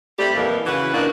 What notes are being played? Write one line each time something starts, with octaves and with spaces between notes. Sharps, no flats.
G3 A3 C4 E4 G4 D5
F2 A#2 E3 A#3
C#3 E3 F#4 B4
A#2 D4 D#4 F#4 A#4 F5